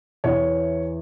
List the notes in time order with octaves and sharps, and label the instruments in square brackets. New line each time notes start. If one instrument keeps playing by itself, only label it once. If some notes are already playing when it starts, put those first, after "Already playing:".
[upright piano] E2 E3 C#5